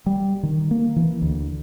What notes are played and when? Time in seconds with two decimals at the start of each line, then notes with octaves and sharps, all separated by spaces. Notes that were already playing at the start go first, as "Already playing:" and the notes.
0.06 G3
0.43 D#3
0.71 A#3
0.96 E3
1.22 D2